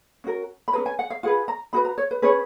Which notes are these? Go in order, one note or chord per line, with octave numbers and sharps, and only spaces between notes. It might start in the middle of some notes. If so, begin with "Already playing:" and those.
C#4 F#4 A#4
B5
C#4 G#4 B4 A#5
G#5
F#5
F5
F4 G#4 B4 F#5
A#5
D#4 F#4 B4 B5
A#5
C#5
B4
C#4 G#4 B4 C#5